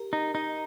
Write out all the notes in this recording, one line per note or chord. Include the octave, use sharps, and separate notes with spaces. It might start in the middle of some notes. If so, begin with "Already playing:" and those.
Already playing: G4 A#4
D#4
D#4 D#5